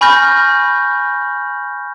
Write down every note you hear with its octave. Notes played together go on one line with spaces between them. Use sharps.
G#5 B5 C#6 F6 G6 A#6